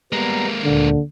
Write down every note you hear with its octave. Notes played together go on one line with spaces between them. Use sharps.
G3 G#3 A#3 B3 A#5
D2 A#2 D3